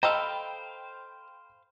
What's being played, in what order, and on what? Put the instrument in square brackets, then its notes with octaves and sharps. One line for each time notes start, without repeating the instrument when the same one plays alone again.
[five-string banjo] A4 D#5 A#5 [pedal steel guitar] C5 F5 [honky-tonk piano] G5 B5